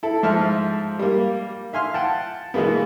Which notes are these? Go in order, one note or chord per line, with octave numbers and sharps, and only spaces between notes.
E4 A4
G#2 F3 E5 A5 F6
G3 A#3
E5 F5 G#5 C6 F6
F#5 G5 A5
B2 E3 G#3 A#3 B3